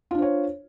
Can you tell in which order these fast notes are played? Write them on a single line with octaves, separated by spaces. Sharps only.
F4 D4 C5 C#5